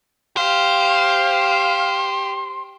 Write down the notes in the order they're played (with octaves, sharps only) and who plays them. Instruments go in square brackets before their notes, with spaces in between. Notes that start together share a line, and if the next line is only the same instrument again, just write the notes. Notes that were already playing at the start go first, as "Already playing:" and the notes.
[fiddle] G4 [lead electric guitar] C5 [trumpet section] F5